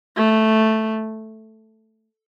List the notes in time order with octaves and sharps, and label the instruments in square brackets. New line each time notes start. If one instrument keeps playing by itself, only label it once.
[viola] A3